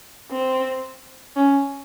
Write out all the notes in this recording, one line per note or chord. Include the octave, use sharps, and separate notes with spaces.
C4
C#4